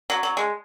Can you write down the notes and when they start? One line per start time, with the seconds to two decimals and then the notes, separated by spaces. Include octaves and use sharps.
0.10 F#3
0.23 F#3
0.37 G#3